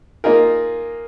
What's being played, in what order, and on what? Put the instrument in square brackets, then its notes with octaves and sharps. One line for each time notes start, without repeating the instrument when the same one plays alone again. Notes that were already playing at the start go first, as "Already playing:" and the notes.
[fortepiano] A#3 D#4 F4 G#4 A#4